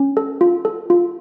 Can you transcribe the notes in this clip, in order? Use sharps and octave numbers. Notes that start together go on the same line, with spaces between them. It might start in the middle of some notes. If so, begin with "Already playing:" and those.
Already playing: C#4
A4
F4
A4
F4